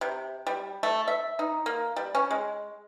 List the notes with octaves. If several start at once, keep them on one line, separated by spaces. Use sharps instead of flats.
C3
G3
A3
E5
D#4
A#3
G3
C#4
G#3